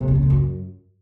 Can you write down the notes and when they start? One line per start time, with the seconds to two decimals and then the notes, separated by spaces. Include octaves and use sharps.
0.01 C3
0.08 B2
0.15 C#3
0.23 A2
0.30 F#2